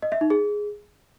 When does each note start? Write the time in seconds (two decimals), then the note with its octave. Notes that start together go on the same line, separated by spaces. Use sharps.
0.02 D#5
0.12 E5
0.21 D#4
0.30 G#4